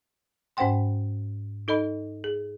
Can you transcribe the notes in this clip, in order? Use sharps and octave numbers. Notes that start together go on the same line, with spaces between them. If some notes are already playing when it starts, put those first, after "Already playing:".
G#2 C#4 C5 F#5 G5 C6
D#4 A4 D#5 B5
G#4